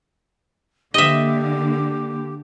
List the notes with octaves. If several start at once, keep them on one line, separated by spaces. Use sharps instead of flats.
D3 A#3 G4 D#5 E5